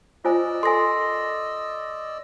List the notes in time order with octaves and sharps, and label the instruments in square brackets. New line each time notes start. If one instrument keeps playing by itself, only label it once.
[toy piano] F4 C5 G#5 [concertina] D5 D#5 E6
[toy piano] A4 A#4 G#5 [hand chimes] C6 A#6